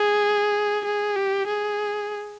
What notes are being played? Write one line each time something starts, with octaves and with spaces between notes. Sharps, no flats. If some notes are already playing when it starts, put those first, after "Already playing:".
Already playing: G#4
G#4
G4
G#4